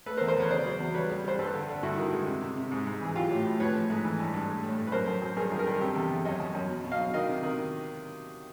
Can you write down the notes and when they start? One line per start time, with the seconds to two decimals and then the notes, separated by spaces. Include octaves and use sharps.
0.06 A3 A4 B4
0.17 A#4 C5
0.21 E2
0.28 A#4 C5
0.36 E2 B4 C#5
0.50 C#3 C5 D5
0.65 F#3
0.80 E2
0.94 G3 B4 C#5
1.10 G3
1.24 G3 C5
1.39 G2 A4 B4
1.54 D3
1.68 D3
1.83 G2 E4 F#4
1.98 D#3
2.13 G#3
2.27 C3
2.42 C3
2.57 C3
2.72 G#2
2.87 G#2
3.01 E3 G#4
3.15 F#3 F4 G4
3.30 A2
3.46 A2
3.60 F3 B4 C#5
3.75 A3
3.90 G#2
4.04 E3
4.19 G2
4.34 G2
4.48 A3
4.63 A2
4.78 A3
4.87 B4
4.92 F#2 A#4 C5
5.07 F#2
5.22 F#2
5.37 G2 G#4 A#4
5.51 D#3
5.59 G#4 A#4
5.67 G2
5.81 C3 G4 A4
5.96 E2
6.11 E2
6.25 F#2 C#5 D#5
6.40 F#2
6.55 F#2
6.70 B2
6.84 B2
6.92 D#5 F5
6.99 F#3
7.14 D#3 D#5 F5
7.28 C3
7.43 D#3